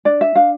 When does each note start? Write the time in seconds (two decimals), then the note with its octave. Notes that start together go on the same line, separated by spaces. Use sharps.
0.05 D4 D5
0.21 E5
0.35 D4 F5